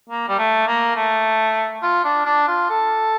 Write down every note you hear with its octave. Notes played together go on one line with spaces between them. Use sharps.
A#3
G3
A3
A#3
A3
F4
D4
D4
F4
A4